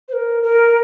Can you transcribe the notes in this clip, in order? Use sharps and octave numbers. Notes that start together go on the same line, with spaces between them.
C5
A#4
A#4